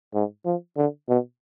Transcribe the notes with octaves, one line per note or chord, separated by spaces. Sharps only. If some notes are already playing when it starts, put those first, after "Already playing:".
G#2
F3
D3
B2